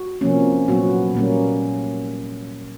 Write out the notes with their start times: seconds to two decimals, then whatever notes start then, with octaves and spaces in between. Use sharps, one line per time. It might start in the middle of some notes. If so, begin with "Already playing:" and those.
Already playing: F#4
0.21 C3 F3 A#3 C#4
0.68 A#2 F#3 B3 F#4
1.15 A#2 G3 A#3 C#4